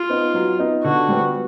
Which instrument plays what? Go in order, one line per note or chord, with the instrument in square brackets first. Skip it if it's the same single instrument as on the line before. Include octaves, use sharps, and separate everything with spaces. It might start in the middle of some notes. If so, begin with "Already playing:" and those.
Already playing: [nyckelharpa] F4
[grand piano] B3 D#4
F#3
B3 D#4
[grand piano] D3 [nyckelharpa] F#4
[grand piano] G3 B3